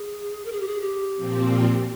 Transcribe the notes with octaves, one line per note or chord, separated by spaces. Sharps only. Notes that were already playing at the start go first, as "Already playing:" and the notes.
Already playing: G#4
A#4
G#4
G4
G#4
G4
A#2 F3 C4